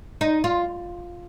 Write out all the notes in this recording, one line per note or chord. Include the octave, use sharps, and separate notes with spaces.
D#4
F4